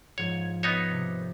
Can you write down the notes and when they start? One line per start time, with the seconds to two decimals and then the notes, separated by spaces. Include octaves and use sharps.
0.18 G#2 F3 C#5 G#6
0.63 B3 D#4 C#5
0.90 C3